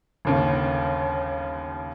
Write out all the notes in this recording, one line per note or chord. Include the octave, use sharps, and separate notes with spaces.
G1 D#2 C#3